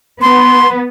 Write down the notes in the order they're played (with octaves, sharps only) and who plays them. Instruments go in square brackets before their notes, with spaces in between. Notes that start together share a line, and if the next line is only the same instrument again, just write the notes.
[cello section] B3 [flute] C6